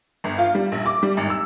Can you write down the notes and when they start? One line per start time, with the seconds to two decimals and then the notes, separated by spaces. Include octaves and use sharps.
0.24 G1
0.38 F4
0.55 G3
0.72 A#1
0.86 D6
1.03 G3
1.17 G#1
1.30 E6